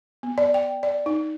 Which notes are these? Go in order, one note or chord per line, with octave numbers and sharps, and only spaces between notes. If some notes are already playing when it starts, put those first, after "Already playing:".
B3
D5
G5
D5
D#4